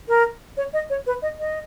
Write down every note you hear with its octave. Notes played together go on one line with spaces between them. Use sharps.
A#4
C#5
D#5
C#5
B4
D#5
D#5